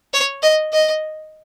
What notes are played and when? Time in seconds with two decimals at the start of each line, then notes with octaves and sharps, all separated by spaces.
0.13 C#5
0.42 D#5
0.72 D#5